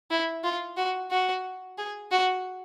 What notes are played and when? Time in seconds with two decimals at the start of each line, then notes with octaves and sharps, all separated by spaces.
0.11 E4
0.44 F4
0.77 F#4
1.11 F#4
1.78 G#4
2.11 F#4